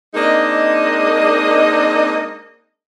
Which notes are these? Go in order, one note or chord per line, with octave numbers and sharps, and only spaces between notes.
G#3 A#3 C4 D4 D#4 D#5